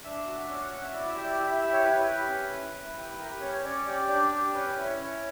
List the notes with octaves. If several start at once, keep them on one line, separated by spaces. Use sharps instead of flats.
D4 E5
F#4
C#4 D5
F#5
F#4 F#5
E5
E4 D5
E5
G4
D5
E4 E5
E5
G4 E5
C#5
E4 B4
C#5
B4
G4
C#4
E4
E4
G4
G4 A#4
B4
C#4 C#5
C#5
C#4 D5
G4 D5
D4 D5
G4
C#4 B4
B4
E4
C#5
C#4